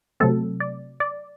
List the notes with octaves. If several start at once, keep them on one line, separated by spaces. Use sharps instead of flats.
C3 F#3 A3 C4 A4
D5
D5